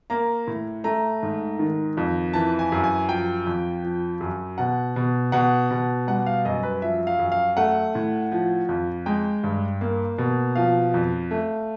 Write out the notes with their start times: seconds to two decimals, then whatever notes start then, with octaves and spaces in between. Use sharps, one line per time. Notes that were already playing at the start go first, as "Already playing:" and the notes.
0.10 A#3 A#5
0.47 A2
0.84 A3 A#5
1.23 G#2
1.59 D#3
1.97 F2
2.34 E3 A5
2.59 G#5
2.72 F#2
2.84 G#5
3.08 F3 G5
3.47 F2
3.84 F3
4.21 F#2
4.58 B2 F#5
4.96 B2
5.32 B2 F#5
5.71 B2
6.08 G3 F#5
6.26 F5
6.45 F#2 D#5
6.63 B4
6.82 F3 E5
7.07 F5
7.19 F#2
7.32 F5
7.57 A3 F#5
7.95 A2
8.32 F3
8.69 F2
9.06 G#3 G5
9.43 G2
9.81 A#3
10.18 B2
10.56 F3 F5
10.94 F2
11.31 A3